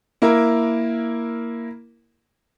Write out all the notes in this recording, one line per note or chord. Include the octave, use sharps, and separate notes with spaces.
A#3 E4 A#4